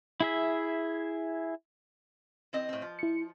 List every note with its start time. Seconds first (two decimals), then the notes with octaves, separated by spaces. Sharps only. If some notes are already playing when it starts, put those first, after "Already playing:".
0.20 E4 G#4 E5
2.53 E3 C4 D#5
2.69 A2 C4
2.82 F3
2.99 E4 C#7